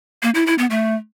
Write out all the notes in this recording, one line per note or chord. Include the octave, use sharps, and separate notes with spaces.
A#3
E4
E4
B3
A3